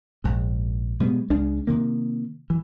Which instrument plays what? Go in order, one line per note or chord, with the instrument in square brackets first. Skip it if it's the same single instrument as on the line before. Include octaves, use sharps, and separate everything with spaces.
[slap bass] A#1 G#2
B2 G3 G#3 B3
C#2 C#3 G#3 D4
C3 D#3 A#3
E3